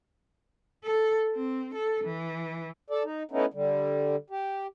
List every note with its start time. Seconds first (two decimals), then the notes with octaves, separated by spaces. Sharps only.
0.84 A4
1.35 C4
1.74 A4
2.04 E3
2.90 A4 D5
3.04 D#4
3.31 A3 B3 C#4 D#4 E4
3.54 D3 G3
4.30 G4